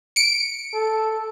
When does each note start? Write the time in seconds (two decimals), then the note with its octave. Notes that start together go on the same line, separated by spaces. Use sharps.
0.16 C#7 D7
0.74 A4